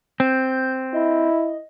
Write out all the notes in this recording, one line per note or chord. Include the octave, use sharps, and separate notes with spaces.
C4 G6
E4 D#5